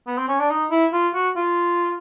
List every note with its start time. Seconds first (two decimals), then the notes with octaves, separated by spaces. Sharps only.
0.07 B3
0.18 C4
0.28 C#4
0.40 D4
0.50 D#4
0.71 E4
0.93 F4
1.14 F#4
1.36 F4